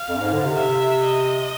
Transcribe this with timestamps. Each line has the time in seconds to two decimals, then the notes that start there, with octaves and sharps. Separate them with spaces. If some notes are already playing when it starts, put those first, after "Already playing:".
Already playing: F5
0.09 F2
0.17 G2
0.21 G#2
0.33 D3
0.45 C3
0.57 E5
1.03 D#5